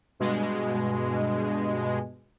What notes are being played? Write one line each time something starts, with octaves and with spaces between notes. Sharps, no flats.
G2 B2 G#3